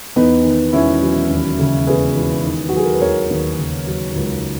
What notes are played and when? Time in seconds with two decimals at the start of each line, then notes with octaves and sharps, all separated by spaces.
0.16 E2 B3 D#4
0.44 D#3
0.73 E1 C#4 E4
1.02 F#3
1.30 D#2
1.59 C#3
1.87 E1 G#4 B4
2.15 E3
2.44 D#3
2.69 F#4
2.73 F#3 G#4
2.85 A#4
2.93 B4
3.01 D#2 A#4 C#5
3.30 D#2
3.58 C#3
3.87 F#3
4.16 C#2